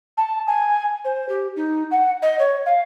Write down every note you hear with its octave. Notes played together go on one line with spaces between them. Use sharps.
A5
G#5
C5
G4
D#4
F#5
D#5
C#5
F5